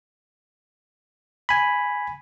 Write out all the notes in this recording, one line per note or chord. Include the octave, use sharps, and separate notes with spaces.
G#5 B5